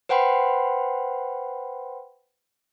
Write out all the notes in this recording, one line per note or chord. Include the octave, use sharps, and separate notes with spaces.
B4 C5 F#5 G5 B5 C6